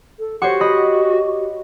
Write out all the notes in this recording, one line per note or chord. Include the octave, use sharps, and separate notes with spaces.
A4
F#4 G4 C5 C#5 C#6
D#5 B5